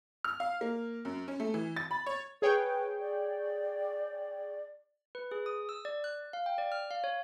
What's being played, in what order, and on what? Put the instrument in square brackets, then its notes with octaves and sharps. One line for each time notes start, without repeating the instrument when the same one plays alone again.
[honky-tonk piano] F6
F5
A#3
F#2
C#4
A3
E3
A6
B5
C#5
[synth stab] G#4 C#5 G5 [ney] B4
[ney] D5
[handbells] B4
G#4
D#6
E6
D5
F#6
F5
G5
D5
F6
F5
C#5